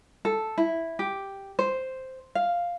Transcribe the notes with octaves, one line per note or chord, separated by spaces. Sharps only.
A4
E4
G4
C5
F5